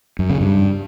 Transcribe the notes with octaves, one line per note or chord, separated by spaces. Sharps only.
F#2
C#3
G2